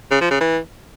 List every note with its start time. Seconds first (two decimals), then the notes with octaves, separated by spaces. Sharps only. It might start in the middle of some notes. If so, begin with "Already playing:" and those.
0.11 C#3
0.21 F3
0.31 C#3
0.41 E3